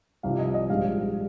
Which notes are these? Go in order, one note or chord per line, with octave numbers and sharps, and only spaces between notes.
C2 C3 F3 F5
D#5
D#5
A#1 G#2 G3 F5